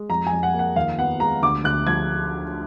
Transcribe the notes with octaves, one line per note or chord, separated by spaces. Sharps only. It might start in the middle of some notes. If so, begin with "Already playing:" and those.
Already playing: G#3
F2 A#5
G#5
F2
F#5
A#3
F#5
D#2 F5
B3 F#5
G#3 A#5
D2 D6
D2 F#6
F3 G#6